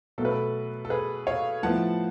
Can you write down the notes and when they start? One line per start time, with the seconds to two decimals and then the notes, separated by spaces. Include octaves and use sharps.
0.18 B2 F#3 A3 A4
0.25 B4
0.31 A4
0.85 A4
0.90 G#4 B4
1.27 C#5 F5
1.63 A2 F3 B3 F#5 A5